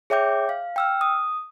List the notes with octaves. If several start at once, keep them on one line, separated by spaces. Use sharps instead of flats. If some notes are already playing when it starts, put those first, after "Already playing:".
G#4 C#5 E5 G5 D6 G6
F5
G5 E6 F6
D#6